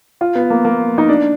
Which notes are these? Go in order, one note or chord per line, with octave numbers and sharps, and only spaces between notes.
F4
B3
A#3
A#3
D#4
D4